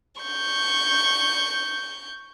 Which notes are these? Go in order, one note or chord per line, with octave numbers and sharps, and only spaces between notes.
C#6 G6